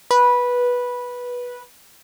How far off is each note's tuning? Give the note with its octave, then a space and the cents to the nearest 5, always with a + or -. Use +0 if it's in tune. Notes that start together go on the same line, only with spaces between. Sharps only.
B4 -10